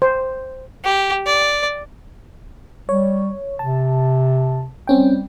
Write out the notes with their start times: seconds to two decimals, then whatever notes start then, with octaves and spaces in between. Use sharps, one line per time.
0.02 C5
0.84 G4
1.26 D5
2.89 G3 C#5
3.59 C3 A5
4.87 G3 C4 C#4 G5